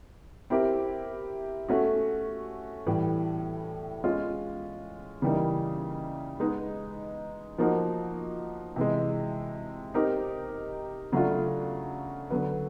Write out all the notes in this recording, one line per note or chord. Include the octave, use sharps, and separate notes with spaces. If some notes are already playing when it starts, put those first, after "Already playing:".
C4 E4 G4 A#4
A3 C#4 F#4
A2 E3 G3
G#3 C#4 F4
C#3 E3 G3 A#3 D#4
G#3 B3 D#4
F3 A#3 D#4 F#4
C3 E3 G#3
C4 D#4 G4 A#4
C#3 F#3 A3 D4 F4
D3 F#3 B3